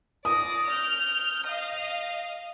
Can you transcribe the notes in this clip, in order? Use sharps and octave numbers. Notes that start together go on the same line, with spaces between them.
D5 D#6 A#6
F6 G6
D#5 F5